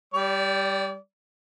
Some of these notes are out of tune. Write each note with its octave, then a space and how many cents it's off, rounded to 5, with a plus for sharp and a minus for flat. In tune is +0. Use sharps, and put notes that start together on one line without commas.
G3 +0 D5 -35